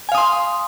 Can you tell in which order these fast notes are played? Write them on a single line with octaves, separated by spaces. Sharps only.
G#5 F5 D#6 C6